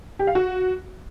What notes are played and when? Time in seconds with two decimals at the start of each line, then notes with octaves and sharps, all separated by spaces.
0.19 G4
0.27 F5
0.35 F#4